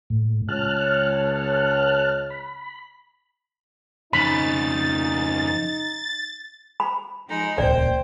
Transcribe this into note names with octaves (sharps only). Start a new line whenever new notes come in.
A2
C#2 C#5 A5 F6 F#6
B5
F2 C#3 D#4 B5 A6
B5
F3 G#3 D#4
D#1 C#2 A#2 C5 D5 G5